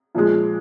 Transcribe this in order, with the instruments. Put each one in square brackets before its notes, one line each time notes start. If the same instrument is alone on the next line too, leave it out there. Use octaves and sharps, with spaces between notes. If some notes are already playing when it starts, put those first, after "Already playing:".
[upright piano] A#2 F3 G#3